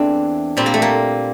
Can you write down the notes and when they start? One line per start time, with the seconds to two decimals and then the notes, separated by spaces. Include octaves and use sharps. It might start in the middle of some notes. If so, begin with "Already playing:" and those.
Already playing: E2 E3 A3 C4 D4
0.57 A#2 G3 C4
0.66 A#3
0.74 A3
0.82 A#3